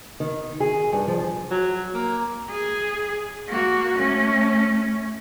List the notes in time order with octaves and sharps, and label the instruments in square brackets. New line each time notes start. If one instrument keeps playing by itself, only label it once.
[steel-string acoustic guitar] D#3
G#4
G2
F3
[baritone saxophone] F#3
A#3
[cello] G#4
A#3 F#4
A3 C#4